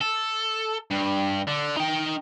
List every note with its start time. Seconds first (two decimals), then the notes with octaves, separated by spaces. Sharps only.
0.01 A4
0.91 G2
1.47 D3
1.77 D#4 G5